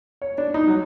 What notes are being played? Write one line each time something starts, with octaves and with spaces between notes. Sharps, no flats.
C#5
D4
D#4
F#3